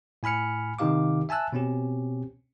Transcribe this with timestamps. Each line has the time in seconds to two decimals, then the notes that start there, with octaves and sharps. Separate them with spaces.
0.23 A2 G#5 B5 F6 C#7
0.79 C3 D#3 D#4 G4 F5 D6
1.29 E5 G#5 A5 E6 F#6
1.53 B2 C4 C#4 G4